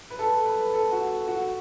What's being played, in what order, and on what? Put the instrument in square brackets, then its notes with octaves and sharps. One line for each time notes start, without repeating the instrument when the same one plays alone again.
[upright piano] B4
A4
B4
A4
F#4
F#4